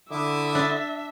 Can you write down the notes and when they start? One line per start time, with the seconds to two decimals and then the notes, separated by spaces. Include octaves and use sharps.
0.11 D3 E4 E5 D6 D#6
0.55 D4